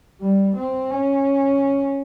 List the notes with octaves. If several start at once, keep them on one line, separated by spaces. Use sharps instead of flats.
G3
C4
C#4